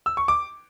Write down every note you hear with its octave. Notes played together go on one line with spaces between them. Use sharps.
E6
C#6
D6